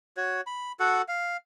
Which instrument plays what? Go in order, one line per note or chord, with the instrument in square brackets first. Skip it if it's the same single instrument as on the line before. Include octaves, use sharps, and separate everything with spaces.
[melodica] F#4 C#5
B5
F#4 A4 F#5
F5